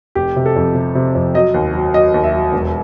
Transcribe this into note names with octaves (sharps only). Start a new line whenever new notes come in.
F1 G4
C3
A4
F2
C3
C3
F2
F#3 D#5
D#2
F#3
F#3 D#5
D#2
E5
F#3
E1